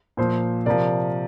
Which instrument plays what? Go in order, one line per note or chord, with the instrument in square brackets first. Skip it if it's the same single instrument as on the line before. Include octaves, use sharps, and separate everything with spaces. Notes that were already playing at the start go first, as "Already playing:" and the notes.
[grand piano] A#2 F3 C5
C3 F3 A#4 D5